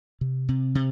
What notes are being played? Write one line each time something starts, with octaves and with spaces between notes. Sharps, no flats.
C3
C3
C3